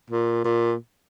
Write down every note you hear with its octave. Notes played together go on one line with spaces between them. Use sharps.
A#2
A#2